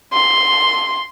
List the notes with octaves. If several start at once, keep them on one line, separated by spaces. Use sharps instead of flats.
C6